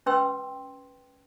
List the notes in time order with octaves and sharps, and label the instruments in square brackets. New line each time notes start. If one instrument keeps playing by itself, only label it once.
[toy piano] C#4 B4 G5 C6 E6